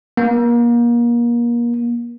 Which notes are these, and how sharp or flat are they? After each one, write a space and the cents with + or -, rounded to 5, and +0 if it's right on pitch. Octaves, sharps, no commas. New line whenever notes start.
A#3 +30